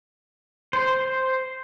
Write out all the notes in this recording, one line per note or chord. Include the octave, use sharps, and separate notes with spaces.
C5